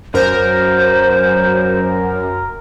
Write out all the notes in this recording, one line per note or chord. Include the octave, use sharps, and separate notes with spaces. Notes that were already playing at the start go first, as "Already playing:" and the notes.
F#2 A#4 C5